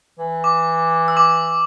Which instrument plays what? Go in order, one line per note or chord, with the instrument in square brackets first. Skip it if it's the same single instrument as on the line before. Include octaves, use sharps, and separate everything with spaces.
[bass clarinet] E3
[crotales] D6
E6
D6